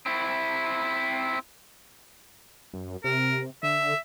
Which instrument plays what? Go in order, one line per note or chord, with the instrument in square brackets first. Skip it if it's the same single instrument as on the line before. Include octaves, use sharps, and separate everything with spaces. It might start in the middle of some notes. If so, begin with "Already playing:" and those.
[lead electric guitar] C4 E4
[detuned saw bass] F#2
[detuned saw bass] C3 [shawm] A#4
[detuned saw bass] D3 [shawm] E5